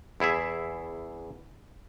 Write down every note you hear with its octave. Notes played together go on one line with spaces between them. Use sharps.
E2 E4 G#4 E5